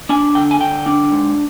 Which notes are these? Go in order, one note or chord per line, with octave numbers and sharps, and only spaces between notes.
D4 G#5
D3 G5
G#5
D3 G5
D4
G#2